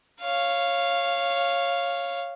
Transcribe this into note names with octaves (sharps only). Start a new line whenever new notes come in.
C#5 F5